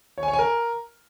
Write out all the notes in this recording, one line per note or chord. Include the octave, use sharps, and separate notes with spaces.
C#5
G#5
C#5
G#5
A#4